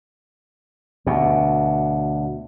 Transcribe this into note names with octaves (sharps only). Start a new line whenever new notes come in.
D2 B2